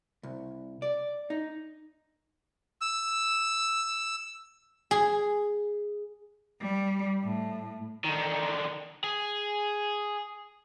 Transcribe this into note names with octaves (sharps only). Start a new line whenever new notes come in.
C2
D5
D#4
E6
G#4
G3
A2
D3 D#3
G#4